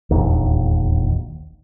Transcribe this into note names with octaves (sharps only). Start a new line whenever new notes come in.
E1 A#1 D#2